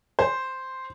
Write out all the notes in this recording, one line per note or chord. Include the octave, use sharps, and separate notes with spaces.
C5